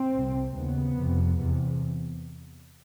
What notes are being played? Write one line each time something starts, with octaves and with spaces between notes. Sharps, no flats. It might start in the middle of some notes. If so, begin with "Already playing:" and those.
Already playing: C4
C2 C3
D#2 C#3 B3
F2 C3
E2 C3